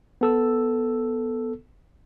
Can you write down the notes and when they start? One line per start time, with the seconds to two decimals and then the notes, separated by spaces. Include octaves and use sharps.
0.21 B3 A4 E6